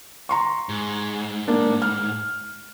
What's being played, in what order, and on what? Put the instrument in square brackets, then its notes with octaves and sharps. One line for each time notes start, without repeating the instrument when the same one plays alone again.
[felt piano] A#5 C6 C#6
[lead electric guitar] G#2
[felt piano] A#3 D4
F6